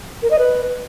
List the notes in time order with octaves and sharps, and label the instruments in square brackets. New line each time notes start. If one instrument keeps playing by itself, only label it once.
[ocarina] A#4
D#5
B4